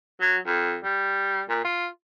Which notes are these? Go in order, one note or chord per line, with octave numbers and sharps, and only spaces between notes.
F#3
F2
G3
A#2
F4